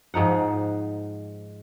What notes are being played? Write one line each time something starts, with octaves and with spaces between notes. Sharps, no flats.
G#2 F3 D#4 F#5